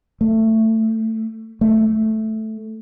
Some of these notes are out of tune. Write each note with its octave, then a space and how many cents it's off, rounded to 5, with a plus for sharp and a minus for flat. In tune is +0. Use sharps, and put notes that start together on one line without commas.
A3 +15
A3 -5